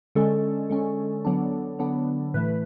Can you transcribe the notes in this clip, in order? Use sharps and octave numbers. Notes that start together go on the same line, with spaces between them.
D3 G#3 C#4 A4
D3 G#3 C#4
D3 F#3 B3 D4
D3 F#3 B3 D4
A2 E3 A3 B4